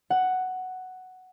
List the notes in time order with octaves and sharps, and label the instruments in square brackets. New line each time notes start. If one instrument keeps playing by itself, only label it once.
[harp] F#5